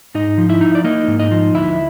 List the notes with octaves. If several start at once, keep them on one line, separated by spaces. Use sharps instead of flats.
G#2 D#4 D#5
F3
E4 E5
D#4
D5
A#3 D#4 D#5
G#2
D#4 D#5
F3
D2 E4 E5